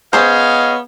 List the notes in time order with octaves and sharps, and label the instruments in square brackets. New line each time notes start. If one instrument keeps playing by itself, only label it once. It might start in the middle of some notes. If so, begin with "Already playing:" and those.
[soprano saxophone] B3 [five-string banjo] C#4 G#4 C5 [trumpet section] C#5 D#5 F5